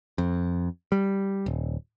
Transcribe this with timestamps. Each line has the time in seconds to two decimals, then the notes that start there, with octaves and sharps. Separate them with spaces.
0.18 F2
0.92 G3
1.46 D#1